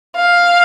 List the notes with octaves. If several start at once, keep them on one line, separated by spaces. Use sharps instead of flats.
F5